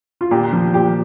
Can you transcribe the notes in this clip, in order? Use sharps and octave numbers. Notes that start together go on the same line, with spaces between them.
F4
A#2 G4
F3
A#2 G4